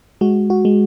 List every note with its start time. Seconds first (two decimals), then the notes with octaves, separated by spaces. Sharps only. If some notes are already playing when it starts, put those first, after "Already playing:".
0.21 G#3 F#4
0.50 F#4
0.65 G#3